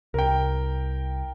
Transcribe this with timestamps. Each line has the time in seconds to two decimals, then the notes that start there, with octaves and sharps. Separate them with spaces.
0.14 C2 A#4 G5